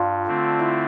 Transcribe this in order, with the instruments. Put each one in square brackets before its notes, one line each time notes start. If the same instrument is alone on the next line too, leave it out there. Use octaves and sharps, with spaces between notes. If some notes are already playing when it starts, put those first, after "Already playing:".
Already playing: [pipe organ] G2 [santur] D4 F4
[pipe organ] D3 A3 C4
[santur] E4